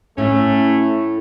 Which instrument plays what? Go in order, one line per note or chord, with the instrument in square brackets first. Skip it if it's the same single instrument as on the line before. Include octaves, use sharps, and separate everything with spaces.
[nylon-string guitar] A2 [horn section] A3 C#4